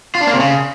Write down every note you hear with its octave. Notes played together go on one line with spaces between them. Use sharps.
F4
D4
A#3
C3
C#3